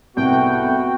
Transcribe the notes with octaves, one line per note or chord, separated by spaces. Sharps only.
C2 A3 B3 F#4 G5